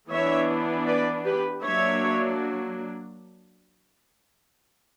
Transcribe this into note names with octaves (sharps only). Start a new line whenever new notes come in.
E3 B3 D4 C#5 E5
B4 D5
G4 B4
F#3 A#3 D4 C#5 E5